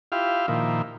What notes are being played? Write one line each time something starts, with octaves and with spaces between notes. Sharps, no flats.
E4 F4 G4 F5
A#2 D#3 F3 E4